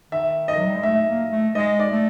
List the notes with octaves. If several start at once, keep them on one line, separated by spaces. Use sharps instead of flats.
D#3 E5
D#5
F#3
G3
G#3
A3 E5
A#3
A3
G#3 D#5
D5
A3